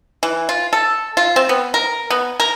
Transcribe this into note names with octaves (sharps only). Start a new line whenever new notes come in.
E3
F4
A4
F4
C4
B3
A#4
B3
A#4